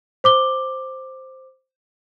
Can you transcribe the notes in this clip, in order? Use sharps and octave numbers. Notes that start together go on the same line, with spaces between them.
C5 D6 G7